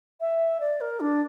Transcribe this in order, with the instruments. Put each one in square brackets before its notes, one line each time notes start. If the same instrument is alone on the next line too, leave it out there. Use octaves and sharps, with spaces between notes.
[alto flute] E5
D5
A#4
D4